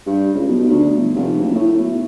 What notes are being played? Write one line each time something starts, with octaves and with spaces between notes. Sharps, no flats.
G2
C#2
B1
D2
G1
F1
F#1
A2
B1